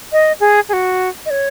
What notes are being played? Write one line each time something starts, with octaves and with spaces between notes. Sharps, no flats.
D#5
G#4
G#4
F#4
D#5
C#5